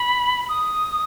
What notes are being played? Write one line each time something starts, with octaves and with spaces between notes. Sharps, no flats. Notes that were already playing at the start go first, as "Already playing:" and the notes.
Already playing: B5
D#6